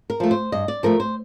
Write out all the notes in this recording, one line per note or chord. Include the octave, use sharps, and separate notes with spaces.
A#4
F3 A3
C5
G2 D#5
D5
F3 A3 A#4
C5